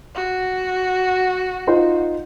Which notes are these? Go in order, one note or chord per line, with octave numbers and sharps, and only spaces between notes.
F#4
D#4 F4 C5